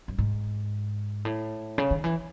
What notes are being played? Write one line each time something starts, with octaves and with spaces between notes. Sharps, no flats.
F#2
G#2
A2
C#3
D#3
E3